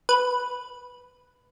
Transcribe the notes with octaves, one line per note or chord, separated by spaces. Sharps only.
B4